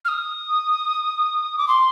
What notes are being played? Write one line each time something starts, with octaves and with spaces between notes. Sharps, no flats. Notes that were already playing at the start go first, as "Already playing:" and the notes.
F6
D#6
D6
C6